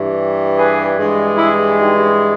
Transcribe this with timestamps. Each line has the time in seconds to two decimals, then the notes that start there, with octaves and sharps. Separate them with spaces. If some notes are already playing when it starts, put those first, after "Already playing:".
Already playing: G2 E3 G3
0.57 G#4 B4
0.98 G2 E3 G#3
1.38 E4 G#4
1.78 D#4 G4